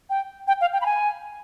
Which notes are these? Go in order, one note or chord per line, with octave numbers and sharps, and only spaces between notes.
G5
G5
F5
G5
B5
G#5